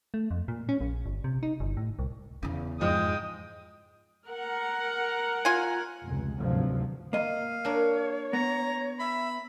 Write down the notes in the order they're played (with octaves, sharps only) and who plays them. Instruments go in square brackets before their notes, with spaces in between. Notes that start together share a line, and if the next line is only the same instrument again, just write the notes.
[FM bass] A3
F2
A#2
C#4
A#1
G1
C3
D#4
G1
A2
C2
[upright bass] E2 C#3
[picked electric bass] F2 G#2 F3 [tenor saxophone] G#3 [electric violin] G5 D#6
[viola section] A#4 F#5
[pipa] F4 G#5
[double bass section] F1 C#2
G#1 D2 G2 C3 F3 F#3
[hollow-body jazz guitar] A#3 D#5 [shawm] F5
[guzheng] D4 A#4 [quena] C#5
[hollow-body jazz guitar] B3 [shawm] A#5
[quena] E5 [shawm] B5